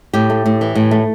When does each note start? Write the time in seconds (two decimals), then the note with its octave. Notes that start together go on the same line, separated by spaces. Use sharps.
0.13 A2 G4
0.30 A3
0.46 A2
0.61 E3
0.75 A2
0.91 A3